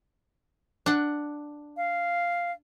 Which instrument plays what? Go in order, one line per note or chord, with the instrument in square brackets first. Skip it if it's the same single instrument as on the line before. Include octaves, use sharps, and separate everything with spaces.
[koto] D4 F#5
[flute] F5